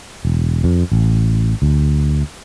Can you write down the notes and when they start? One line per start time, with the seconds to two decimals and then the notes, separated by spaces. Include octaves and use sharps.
0.25 E1
0.64 F2
0.92 A1
1.62 D2